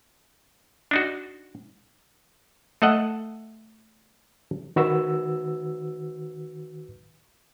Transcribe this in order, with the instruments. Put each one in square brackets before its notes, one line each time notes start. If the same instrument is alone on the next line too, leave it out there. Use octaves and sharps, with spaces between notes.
[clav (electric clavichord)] D4 D#4 F#4
A3 A4 D#5 F#5
[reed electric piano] D#3 F#4 B4 E6